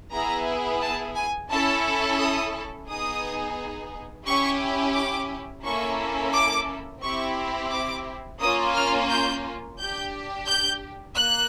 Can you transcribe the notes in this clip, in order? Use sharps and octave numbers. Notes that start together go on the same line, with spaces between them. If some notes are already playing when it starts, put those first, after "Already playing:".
B3 E4 G#4 A#5
A5
G#5
C#4 E4 A4 A5
D#6
B3 D#4 G#4 D#6
C#4 E4 G4 C#6
D6
A#3 C#4 E4 A4 C#6
D6
C4 E4 G4 C#6
D6
A#3 C#4 F4 D#6
F6
G6
D4 G4 G6
G6
A#3 F#6